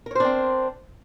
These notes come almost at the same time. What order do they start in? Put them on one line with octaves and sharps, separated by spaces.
A#4 C#5 C5 D4 C4